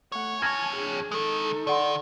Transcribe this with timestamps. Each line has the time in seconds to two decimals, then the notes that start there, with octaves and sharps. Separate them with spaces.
0.12 A3 C#5 F#5
0.42 F2 C#5 G#5 A5 F6 G#6 A#6
0.76 D4 G#4
1.11 D#3 G#3 D#4 A4
1.67 D#3 D5 F#5 C6